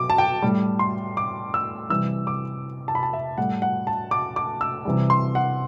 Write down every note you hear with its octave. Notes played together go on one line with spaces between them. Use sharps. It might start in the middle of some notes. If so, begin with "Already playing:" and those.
Already playing: B2 F#3 D6
A5
G5
A2 G3
C6
D6
E6
C3 E3 G3 E6
D6
A5
B5
A5
E5
A2 G3 F#5
F#5
A5
D6
D6
E6
C3 E3 G3
C6
F#5